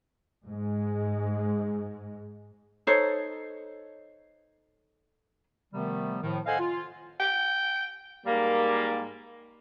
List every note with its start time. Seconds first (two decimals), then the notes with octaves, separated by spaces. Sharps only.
0.46 G#2 G#3
2.87 D#4 A4 C5 C#5
5.73 C3 D#3 F3 G3 A3 B3
6.22 A2 D#3 F3
6.46 A4 C5 D#5 F5 F#5 G#5
6.60 F4
7.20 G5
8.25 G#2 G3 A#3